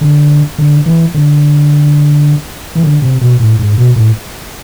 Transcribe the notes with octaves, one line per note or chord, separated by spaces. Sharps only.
D3
D3
E3
D3
E3
D3
C3
B2
A2
G#2
B2
A2